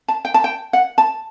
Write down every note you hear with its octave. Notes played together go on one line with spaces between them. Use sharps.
A5
G5
A5
G5
F#5
A5